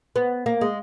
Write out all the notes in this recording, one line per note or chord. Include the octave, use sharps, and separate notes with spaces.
B3
A#3
G#3